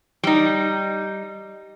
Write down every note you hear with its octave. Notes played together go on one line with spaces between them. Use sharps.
G3 D#4